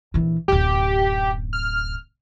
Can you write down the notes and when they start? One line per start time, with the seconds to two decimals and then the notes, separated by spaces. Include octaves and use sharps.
0.14 A#1 E3
0.48 D1 F#2 G4
1.53 F6